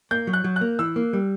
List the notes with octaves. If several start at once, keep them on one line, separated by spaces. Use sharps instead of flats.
A#3 G6
F#3
F#6
F#3
F#6
A#3
E3 E6
A#3
G3